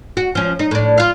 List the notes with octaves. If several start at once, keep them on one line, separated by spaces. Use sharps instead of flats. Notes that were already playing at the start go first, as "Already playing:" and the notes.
F#4
F3 C#4
D#4
A2 D4
F4 F5